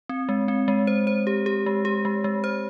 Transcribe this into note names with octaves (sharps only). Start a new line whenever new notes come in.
C4
G#3
C4
G#3
C5
C5
G4
G4
G#3
G4
G#3
G#3
C5